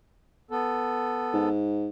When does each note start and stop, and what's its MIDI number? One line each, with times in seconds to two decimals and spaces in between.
0.51 1.49 59
0.51 1.49 69
1.33 1.89 44